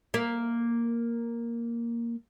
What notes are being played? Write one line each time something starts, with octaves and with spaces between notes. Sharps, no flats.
A#3 E5